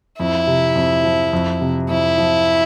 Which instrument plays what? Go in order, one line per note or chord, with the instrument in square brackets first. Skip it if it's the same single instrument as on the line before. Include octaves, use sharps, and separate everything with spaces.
[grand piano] F2 [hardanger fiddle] E4
[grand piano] C3
F2
F3
F2
C3
[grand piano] F2 [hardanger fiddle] E4
[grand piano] F3